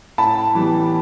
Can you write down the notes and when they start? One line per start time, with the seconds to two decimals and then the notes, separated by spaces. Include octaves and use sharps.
0.18 A2 A5 B5
0.55 E3 G3 B3